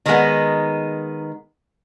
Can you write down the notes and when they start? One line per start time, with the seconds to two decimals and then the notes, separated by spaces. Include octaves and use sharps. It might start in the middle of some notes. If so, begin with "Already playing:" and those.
0.06 D#3 G#3 B3 D#4